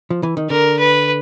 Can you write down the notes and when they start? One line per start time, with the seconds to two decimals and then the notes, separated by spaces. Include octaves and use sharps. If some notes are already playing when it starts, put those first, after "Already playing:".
0.10 F3
0.23 E3
0.37 D#3
0.49 D3 A#4
0.79 B4